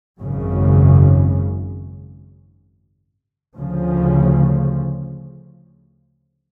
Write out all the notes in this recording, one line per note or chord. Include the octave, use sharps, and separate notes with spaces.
G#1 F#2 C#3
D2 C#3 F3